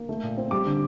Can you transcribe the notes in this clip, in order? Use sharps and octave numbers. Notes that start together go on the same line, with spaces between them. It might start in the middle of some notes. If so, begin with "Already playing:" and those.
Already playing: A#3
A3
A#2
C4
G3 D6
D3